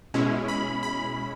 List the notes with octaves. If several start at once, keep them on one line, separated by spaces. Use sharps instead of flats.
B2 G#3 C#4 E4
B5
B5